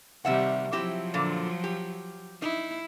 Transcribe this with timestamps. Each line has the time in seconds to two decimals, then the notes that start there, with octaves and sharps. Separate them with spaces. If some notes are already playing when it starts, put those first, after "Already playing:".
0.25 C3 D#3 G3 E5 F#5
0.72 F3 F#3 C4 E4 G4
1.14 A#2 D3
1.64 G4
2.42 D#4 E4